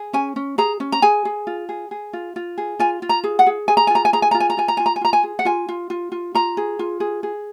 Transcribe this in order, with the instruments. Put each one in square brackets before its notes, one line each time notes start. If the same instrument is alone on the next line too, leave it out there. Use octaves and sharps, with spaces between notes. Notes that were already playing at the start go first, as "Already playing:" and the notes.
Already playing: [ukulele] G#4
C#4 G#5
C#4
G#4 A#5
C#4
A#5
G#4 G#5
G#4
F4
G#4
G#4
F4
F4
G#4
F4 G#5
F4
A#5
G#4
F#5
G#4
G#4 G#5
A#5
F4 G#5
A#5
G#5
G#4 A#5
G#5
F4 A#5
G#5
A#5
F4 G#5
A#5
F4 G#5
A#5
G#5
F4 A#5
G#5
G#4
F#5
F4 G#5
F4
F4
F4
F4 A#5
G#4
F4
G#4
G#4